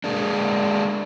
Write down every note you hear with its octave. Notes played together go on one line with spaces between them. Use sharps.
G#3 A#3 D4